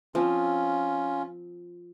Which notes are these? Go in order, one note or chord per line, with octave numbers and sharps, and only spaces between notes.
F3 C4 C#4 F4